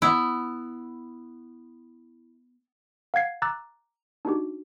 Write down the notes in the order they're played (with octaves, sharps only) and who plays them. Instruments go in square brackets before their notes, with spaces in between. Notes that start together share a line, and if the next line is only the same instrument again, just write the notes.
[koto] B3 E4
[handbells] F5 F#5 G#6 C7
A#5 D6 E6 F#6 A6
D4 D#4 F#4 G4